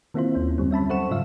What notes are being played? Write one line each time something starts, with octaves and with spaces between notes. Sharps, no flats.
D#3 A#3 C4 E4 F4 C5
D#2 C#4
F#2 D3 G3 C4
C#4 E5 A5 B5
F#3 A4 C5 F#5 C#6 E7
G#2 C#3 F4 E5 F5